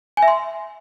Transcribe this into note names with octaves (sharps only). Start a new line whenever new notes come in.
G#5
E5
C6